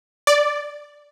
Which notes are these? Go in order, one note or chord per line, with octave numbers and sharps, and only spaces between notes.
D5